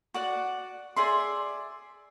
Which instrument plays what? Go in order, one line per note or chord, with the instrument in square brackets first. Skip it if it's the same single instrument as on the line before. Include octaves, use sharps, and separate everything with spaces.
[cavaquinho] F#4 D5 F#5
G#4 D5 E5 C6